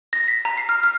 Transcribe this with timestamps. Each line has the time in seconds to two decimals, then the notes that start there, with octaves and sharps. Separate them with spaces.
0.13 A#6
0.28 B6
0.45 A#5
0.58 C7
0.69 F6
0.83 F6